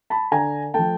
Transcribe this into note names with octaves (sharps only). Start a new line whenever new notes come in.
A5 B5
D3 G#5 A#5
F3 A3 G5 A5